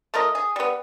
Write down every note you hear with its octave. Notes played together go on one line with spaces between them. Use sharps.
A3 F4 A#4 D#5
G#4
G3 B3